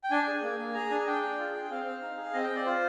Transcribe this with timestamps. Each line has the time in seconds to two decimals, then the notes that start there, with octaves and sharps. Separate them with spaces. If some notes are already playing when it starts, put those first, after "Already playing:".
0.04 G5
0.11 D4 G#5
0.27 G#4
0.42 A#3
0.59 A#3
0.74 G#4 A#5
0.90 D4 G#5
1.07 D4 G5
1.22 G#4
1.38 F4
1.54 G#4
1.65 G5
1.71 C4 F5
1.85 C4
2.02 D#4
2.17 G#4
2.34 C4 D#5
2.44 G5
2.50 C4
2.56 D5
2.66 F4 C5